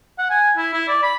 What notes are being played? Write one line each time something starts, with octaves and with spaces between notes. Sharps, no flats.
F#5
G#5
E4
E4
D5
B5